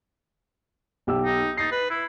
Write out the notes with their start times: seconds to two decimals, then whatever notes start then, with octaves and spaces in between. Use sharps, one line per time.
1.07 B1 G4 E6
1.24 D#4
1.58 D#4 A6 C7
1.72 B4
1.90 E4